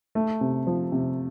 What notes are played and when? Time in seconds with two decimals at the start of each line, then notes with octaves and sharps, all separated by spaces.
0.15 A3
0.41 C3
0.67 F3
0.92 C3